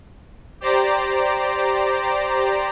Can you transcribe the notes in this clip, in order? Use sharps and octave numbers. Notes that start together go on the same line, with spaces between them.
G4 C5 D5 A#5 D6